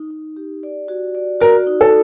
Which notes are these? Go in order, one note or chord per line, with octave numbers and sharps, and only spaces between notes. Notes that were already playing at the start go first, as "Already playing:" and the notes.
Already playing: D#4
D#4
G4
D5
F#4
D5
F#4 A#4
D#4
A4